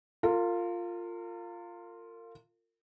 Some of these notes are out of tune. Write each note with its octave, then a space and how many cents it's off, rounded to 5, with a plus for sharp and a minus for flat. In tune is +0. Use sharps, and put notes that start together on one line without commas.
F4 +0 A#4 -40